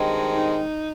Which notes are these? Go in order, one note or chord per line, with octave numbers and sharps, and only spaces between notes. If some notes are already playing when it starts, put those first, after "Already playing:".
Already playing: G2 D#3 G#3 C4
D#4